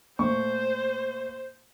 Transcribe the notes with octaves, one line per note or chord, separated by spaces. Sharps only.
A#2 A3 C5 C#6